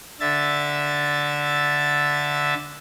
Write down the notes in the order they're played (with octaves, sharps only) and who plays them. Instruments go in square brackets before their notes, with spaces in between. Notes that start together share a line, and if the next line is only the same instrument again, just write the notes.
[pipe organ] D3 E5 A6